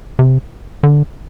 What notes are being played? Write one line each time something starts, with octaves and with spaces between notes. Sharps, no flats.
C3
D3